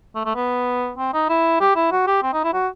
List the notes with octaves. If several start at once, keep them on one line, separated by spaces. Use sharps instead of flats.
A3
A3
B3
C4
D#4
E4
G4
E4
F#4
G4
C4
D#4
E4
F#4